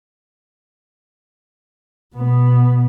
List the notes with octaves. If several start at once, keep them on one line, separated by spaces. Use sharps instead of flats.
B2 B3